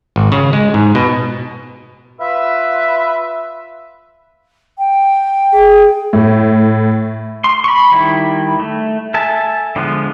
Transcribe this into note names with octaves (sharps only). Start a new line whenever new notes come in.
G#1
C#3
G#3
G#2
B2
F4 B4 E5
G5
G#4
A2
C6
B5 C#6
D#3 G3 E4
A3
A4 E5 G#5 A5
D3 F3 G#3 B3